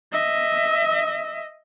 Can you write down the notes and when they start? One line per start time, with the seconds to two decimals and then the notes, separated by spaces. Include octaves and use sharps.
0.12 D#5 E5